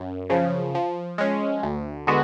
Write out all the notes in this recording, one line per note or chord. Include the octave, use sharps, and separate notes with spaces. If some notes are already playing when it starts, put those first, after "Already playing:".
Already playing: F#2
C#3 F3
F3
G#3 C#4
D2
D3 G#3 B3 F#4